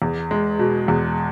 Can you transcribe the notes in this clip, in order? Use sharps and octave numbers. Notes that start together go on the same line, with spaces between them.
E2
G#3
B2
E2